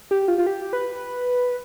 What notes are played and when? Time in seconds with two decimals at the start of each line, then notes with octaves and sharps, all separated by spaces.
0.11 G4
0.28 F4
0.38 F4
0.47 G4
0.73 B4